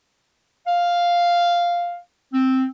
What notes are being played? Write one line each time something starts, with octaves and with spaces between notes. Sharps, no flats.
F5
C4